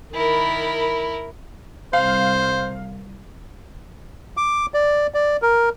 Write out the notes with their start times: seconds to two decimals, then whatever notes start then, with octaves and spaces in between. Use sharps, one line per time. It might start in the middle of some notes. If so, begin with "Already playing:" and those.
0.14 D#3 E4 A#4 B5
1.93 C2 C5 F5
4.37 D6
4.74 D5
5.14 D5
5.42 A#4